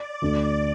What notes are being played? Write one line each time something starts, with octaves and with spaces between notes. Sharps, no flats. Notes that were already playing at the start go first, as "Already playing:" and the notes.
Already playing: D5
D2 D3 A3 D4